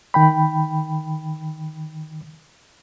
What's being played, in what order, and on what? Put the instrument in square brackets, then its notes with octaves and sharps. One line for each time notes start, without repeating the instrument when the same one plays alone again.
[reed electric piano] D#3 G5 B5